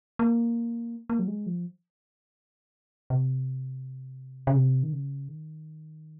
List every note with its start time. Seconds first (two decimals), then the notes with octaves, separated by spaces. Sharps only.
0.19 A#3
1.10 A#3
1.19 F#3
1.28 G#3
1.46 F3
3.10 C3
4.47 C#3
4.55 C3
4.83 D#3
4.93 C#3
5.28 D#3